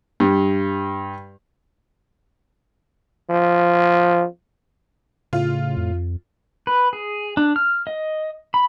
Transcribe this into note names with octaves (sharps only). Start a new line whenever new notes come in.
G2
F3
A2 C#3 F4
F2
B4
G#4
D4
F6
D#5
B5